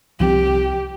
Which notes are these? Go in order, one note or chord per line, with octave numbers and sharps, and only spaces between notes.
C2 F3 C4 G4